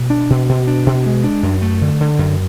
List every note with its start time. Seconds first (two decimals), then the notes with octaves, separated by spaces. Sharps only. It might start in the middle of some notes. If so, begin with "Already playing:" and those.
Already playing: B2
0.10 D4
0.30 B2
0.49 B2
0.67 D4
0.86 B2
1.06 G#3
1.24 D4
1.43 F#2
1.62 A3
1.82 D3
2.01 D3
2.19 F#2